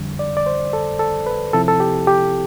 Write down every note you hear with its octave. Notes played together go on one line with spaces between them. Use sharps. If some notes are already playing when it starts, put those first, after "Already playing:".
Already playing: F2 D3 G3
D5
D5
C5
A4
A4
B4
C3 F3 C4 E4 A4
A4
G4
G4